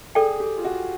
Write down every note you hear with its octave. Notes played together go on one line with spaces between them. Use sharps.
G#4 A4 D5 G5
G4
F4
F#4